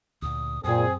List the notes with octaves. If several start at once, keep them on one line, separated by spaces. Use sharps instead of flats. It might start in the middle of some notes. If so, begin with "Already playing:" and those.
D2 A#2 D#6
F#2 A#2 C4 G#4 D#6